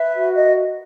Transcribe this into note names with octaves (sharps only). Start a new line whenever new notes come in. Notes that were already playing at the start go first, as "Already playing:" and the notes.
Already playing: B4 E5
F#4
A#4 D#5